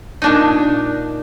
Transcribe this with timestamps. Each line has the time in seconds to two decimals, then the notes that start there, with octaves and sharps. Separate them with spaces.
0.22 A#2 D4 D#4